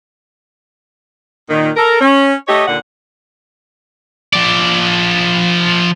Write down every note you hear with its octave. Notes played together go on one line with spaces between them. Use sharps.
A#2 D#3
A4 A#4
C#4
A3 G4 C#5 D#5
D#2 A#2 D3 F#5
F3 D5